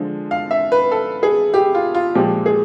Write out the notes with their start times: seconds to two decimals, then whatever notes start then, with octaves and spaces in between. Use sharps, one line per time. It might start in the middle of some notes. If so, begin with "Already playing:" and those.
Already playing: D3 F3 G#3
0.31 F5
0.51 E5
0.72 B4
0.92 A4
1.23 G#4
1.54 G4
1.75 F4
1.94 F4
2.15 A#2 F3 G#3 G4
2.46 G#4